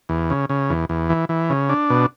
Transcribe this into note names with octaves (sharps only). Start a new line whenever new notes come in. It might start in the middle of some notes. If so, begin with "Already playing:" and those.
E2
C#3
C#3
E2
E2
E3
E3
C#3
D4
B2